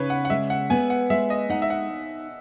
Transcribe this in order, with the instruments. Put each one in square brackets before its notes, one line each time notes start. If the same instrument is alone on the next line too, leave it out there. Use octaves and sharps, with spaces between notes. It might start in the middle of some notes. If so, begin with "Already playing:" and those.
Already playing: [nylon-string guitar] C#3 D#4 [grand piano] B4 C#5
[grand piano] F#5
F#5
[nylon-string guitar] G#3 [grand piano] E5
[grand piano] F#5
[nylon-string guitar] B3 [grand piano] G#5
[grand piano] F#5
[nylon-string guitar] G#3 [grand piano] E5
[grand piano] D#5
[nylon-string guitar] D#4 [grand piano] F#5
[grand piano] E5
F#5